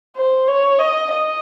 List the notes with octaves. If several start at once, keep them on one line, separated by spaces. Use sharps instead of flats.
C5
C#5
D#5
D#5